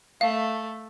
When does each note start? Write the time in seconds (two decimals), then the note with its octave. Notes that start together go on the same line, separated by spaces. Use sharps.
0.21 A3 F5